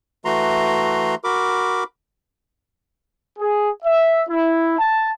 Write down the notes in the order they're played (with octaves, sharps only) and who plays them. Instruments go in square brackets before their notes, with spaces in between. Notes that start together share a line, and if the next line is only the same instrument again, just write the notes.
[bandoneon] E3 A3 F#4 A#5 C6
F#4 A#4 B5 D6
[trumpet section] G#4
E5
E4
A5